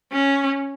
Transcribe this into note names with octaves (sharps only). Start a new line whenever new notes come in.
C#4